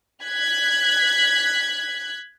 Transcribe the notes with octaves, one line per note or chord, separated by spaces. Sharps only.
F#6 G#6 B6